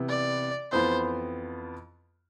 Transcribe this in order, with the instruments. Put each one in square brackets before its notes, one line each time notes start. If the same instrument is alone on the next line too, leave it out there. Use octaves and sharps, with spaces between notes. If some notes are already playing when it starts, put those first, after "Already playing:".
Already playing: [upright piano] C3 E3 B3
[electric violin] D5
[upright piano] F2 E3 B3 F4 [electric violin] C5